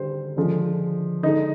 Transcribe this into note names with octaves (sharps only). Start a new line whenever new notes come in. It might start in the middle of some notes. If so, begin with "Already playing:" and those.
Already playing: D3 G3 C5
D3 F3 G#3
D3 G#3 D#4